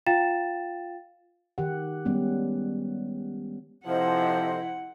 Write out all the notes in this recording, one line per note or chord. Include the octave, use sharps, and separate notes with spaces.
F4 F5 G5 A6 E7
D#3 G4 F#5
G3 G#3 B3 C#4
C3 F3 E4 A4 C5 D#5 F#5